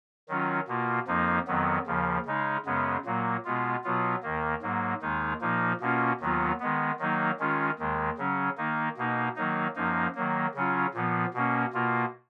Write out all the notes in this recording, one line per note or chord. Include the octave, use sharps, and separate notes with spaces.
D#3 F#3 C#4 F4
B2 A#3 F4
F2 F3 A#3 D#4
F2 D#3 F#3 B3
D#2 C#3 F3
C#3 G#3 D#4
F#2 C#3 G#3 B3
A#2 F#3 A#3
B2 G#3 B3 F4
B2 F#3 B3 F4
D#2 D#3 A#3
G#2 F#3 A#3
D#2 D#3 G#3 D#4
A#2 F3 A#3 D#4
B2 A#3 C#4 F4
D#2 D#3 F#3 B3 F4
D#3 G#3 B3
D#3 F#3 A#3 D#4
D#3 G#3 C#4 F4
D#2 D#3 G#3
C#3 F#3 C#4
D#3 A#3 D#4
B2 A#3 D#4
D#3 F#3 A#3 D#4
F#2 F3 A#3 D#4
D#3 F#3 A#3
C#3 F#3 C#4 F4
A#2 F3 B3
B2 A#3 C#4
B2 A#3 F4